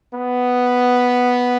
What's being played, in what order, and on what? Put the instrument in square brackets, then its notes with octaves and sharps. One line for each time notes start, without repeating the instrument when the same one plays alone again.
[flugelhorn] B3